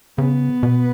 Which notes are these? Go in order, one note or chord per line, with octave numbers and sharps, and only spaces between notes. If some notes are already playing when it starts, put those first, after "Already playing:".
C#3 B3
B2